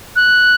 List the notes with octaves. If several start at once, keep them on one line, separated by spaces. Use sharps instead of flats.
F#6